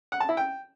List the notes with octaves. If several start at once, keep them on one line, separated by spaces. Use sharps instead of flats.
F#5
A5
E4
G5